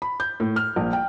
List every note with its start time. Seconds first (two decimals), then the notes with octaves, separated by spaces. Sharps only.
0.02 B5
0.20 G6
0.40 A2
0.56 F6
0.76 A#1
0.93 G5